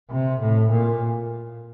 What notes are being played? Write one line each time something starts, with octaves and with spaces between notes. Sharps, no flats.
C3
A2
A#2